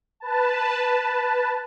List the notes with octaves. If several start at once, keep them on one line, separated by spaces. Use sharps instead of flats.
B4 A5